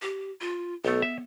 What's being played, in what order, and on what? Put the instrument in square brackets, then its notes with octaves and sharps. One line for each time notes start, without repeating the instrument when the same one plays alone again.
[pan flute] G4
F4
[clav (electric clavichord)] B1 A3 [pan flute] B3
[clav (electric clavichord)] E5